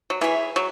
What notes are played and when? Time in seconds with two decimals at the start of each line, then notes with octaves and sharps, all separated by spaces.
0.10 F#3
0.21 E3 E4 G#4 C#5 E5
0.56 F#3